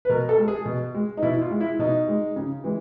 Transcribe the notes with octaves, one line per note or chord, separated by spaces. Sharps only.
B4
B2 A#4
A4
G#3
G#4
B2
G#3
D#4
B2 E4
F4
G#3
E4
B2 D#4
G#3
C#3
E3 G#3